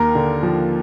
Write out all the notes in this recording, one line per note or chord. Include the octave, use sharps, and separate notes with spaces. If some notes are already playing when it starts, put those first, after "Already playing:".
Already playing: D#2 A#4
D3
F3